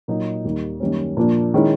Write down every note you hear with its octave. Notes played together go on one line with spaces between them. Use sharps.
A#2 F#3 A#3 D#4
D#2 D#3 G3 A#3 D#4
F#2 D#3 G3 A#3 C#4
A#2 F3 A#3 D4
D#3 G#3 C#4 E4